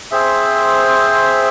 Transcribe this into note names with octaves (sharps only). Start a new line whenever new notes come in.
C4 G#4 C5 E5